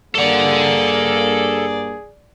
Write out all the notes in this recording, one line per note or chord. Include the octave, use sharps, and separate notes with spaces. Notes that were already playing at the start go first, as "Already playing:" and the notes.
G2 A#3 G#4 A4 D5 F#5